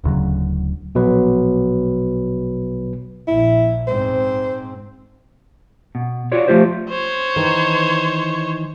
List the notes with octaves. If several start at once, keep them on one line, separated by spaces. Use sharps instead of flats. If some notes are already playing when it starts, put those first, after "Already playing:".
D1 D2 C#3 F#3
A#1 B2 F#3 B4
A#1 E4
G#2 C4 C5
B2
F4 F#4 C#5 D5
F3 G#3 A3 F4 G4 C5
C5 C#5
D#3 E3 A#4